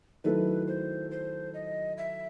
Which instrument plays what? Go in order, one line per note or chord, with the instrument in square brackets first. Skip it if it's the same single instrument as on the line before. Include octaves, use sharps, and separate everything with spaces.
[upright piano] D#3 F#3 A3 E4 A4 [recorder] B4
[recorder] C5
C5
D#5
E5